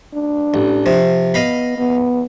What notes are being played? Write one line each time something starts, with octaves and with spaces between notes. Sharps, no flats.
D4
A1
C3 F3
B3 D#5 F5 B5
B3